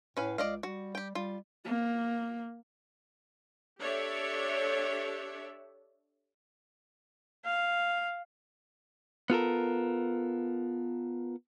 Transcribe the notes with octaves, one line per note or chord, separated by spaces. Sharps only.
A2 C#4 B4 F5
C#2 D5 D#5 F5
G3 F#4
G4 G5
G3 F4
A#3
D4 G4 A4 C#5 D5 E5
F5
B3 F4 A4 A#4